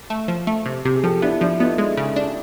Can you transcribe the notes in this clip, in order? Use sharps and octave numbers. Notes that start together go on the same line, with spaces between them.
A3
F3
A3
C3
C3
G#4
F3 G4 A4
B3 D4 E4
F3 D4 E4
B3 D#4 F4
G#3
C#3
D4